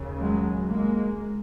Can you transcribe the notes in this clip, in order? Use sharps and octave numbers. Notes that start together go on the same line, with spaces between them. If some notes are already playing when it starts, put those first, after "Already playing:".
Already playing: D#2 C#3
F#3 G#3
G#3 A#3